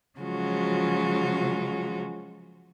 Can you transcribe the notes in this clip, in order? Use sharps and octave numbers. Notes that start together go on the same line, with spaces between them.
C#3 F3 F#3 G#3 F4 F#4